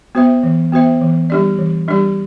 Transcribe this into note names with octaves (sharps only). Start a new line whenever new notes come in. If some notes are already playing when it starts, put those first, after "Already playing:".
B3 F#4 C5 E5
E3
B3 F#4 C5 E5
E3
G3 D4 G4 D5
E3
G3 D4 G4 D5